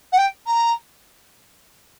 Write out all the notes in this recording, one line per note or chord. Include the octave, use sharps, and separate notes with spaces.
F#5
G5
A#5